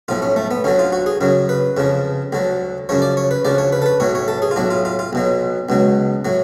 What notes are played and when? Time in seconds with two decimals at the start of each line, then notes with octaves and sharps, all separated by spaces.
0.08 B1 A2 F3 F4
0.22 C#4
0.36 A3
0.51 B3
0.64 D2 D3 F#3 C#4
0.79 F4
0.92 F#4
1.06 G#4
1.21 F#2 C#3 F#3
1.49 B4
1.77 F2 C#3 F3
2.33 D2 D3 F#3
2.89 F#2 C#3 F3 C#5
3.02 D5
3.17 C#5
3.31 B4
3.45 D2 C#3 F3 D5
3.58 C#5
3.73 B4
3.82 A4
3.86 B4
4.00 B1 A2 F#3 C#5
4.15 C#5
4.28 A4
4.42 G#4
4.51 F4
4.56 B1 A2 F#3 D4
4.70 F4
4.85 F4
4.99 F4
5.13 B1 B2 F#3
5.69 C#2 B2 F#3
6.25 A2 F#3